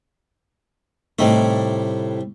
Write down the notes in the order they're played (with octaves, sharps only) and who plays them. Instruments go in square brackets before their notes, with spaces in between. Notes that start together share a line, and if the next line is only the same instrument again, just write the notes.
[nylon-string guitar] A2 D#4 [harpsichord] C3 G3 A3